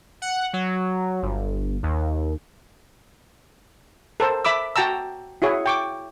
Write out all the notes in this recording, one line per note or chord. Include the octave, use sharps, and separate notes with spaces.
F#5
F#3
G1
D#2
A4 A#4 C5
E5 B5 D6 E6
F#4 G5 A5 A#5 E6
E4 F#4 G#4 C#5
G5 C#6 D6